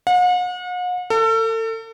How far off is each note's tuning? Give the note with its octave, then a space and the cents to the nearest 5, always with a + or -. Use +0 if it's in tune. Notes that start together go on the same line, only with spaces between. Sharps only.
F#5 -45
A4 +35